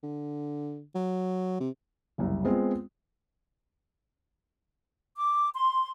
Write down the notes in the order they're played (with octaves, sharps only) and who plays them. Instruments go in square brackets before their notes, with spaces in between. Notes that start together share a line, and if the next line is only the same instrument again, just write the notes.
[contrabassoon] D3
F#3
C3
[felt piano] F#1 C2
G#3 B3 C4 F4
[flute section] D6
C6